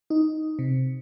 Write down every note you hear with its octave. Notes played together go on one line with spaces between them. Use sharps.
D#4
C3